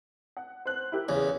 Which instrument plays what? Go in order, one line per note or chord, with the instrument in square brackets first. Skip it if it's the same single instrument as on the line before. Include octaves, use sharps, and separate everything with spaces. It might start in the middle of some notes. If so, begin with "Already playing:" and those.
[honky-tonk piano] F#5
C5 F#6
E4 G4 A#4
[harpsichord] E2 C#3